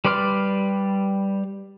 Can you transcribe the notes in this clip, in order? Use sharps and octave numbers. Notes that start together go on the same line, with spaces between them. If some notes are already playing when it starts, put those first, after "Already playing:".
G3 B4 D5 C6 F6